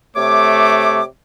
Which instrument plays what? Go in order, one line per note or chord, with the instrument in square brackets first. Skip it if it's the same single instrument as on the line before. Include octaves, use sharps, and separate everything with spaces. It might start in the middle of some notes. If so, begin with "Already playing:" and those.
[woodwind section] C3 C#5 D6 [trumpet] A3